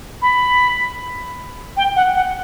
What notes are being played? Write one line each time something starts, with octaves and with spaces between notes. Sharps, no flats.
B5
G5
F#5
F#5